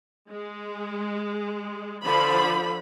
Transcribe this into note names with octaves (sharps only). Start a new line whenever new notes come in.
G#3
D3 F3 B5